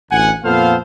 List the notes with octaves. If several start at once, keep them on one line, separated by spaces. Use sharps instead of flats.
A1 D2 F#5 G#5
F2 A#2 B3 A4 C5 F5